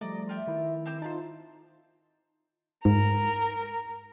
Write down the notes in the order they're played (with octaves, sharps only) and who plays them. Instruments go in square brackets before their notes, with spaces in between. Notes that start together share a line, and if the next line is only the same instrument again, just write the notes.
[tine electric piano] F3 G3 A3 [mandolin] D5 D#5 A#5
[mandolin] F4 G4 E5
[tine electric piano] D#3 E4
[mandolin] C4 G4 E6
[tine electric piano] D#4 F4 [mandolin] A4 B4 C5
[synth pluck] G#2 [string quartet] A#4